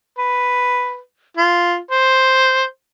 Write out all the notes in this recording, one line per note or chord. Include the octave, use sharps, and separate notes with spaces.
B4
F4
C5